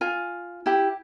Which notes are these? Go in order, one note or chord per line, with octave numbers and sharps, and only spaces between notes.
F4 G#5
E4 G4